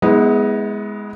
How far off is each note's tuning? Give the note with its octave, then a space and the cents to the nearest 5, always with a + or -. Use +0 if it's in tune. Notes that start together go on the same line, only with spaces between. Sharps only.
G#3 +0 B3 +0 E4 -35